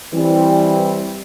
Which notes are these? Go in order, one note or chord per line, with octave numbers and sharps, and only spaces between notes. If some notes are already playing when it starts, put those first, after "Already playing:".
E3 G3 C4